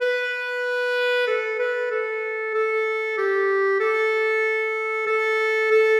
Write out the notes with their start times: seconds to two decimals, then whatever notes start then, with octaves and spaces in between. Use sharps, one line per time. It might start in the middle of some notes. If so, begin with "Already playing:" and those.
0.01 B4
1.27 A4
1.59 B4
1.91 A4
2.54 A4
3.18 G4
3.80 A4
5.07 A4
5.71 A4